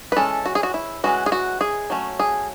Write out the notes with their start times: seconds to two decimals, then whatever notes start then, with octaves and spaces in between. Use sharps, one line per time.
0.12 B4
0.16 E3 G#3 C#4 A4
0.45 F#4
0.55 G#4
0.63 F#4
0.74 E4
1.04 E3 G#3 C#4 F#4
1.26 G#4
1.32 F#4
1.61 G#4
1.90 F#3 A3 C#4
2.20 G#4